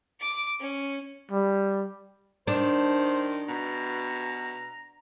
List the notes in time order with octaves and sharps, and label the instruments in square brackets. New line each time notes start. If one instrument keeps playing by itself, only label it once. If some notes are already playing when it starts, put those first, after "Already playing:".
[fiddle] D6
C#4
[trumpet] G3
[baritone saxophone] D#3 [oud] D4 [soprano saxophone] C5
[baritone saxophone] B2 [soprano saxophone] A#5